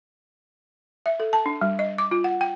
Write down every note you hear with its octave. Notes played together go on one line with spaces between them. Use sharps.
E5
A4
A5
D4
G3
D#5
D6
F4
F#5
G5